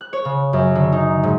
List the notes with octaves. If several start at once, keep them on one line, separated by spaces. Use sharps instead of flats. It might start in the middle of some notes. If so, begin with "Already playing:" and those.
F#6
C#5
C#3
F#2
D3
D#4
G#2